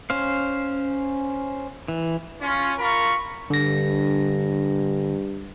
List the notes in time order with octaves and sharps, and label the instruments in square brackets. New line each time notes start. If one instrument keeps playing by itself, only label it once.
[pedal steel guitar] C#4 C5 F5
E3
[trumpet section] C#4 F4
F4 A#4 B5 C#6
[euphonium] G2 [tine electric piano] D3 A#6